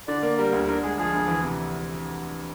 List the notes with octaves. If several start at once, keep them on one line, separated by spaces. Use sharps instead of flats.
D3 D5
A#3 D5
G3 A#4
D2
D3 A#4
G#3 G#4
F3 G#4
D2
E3
C3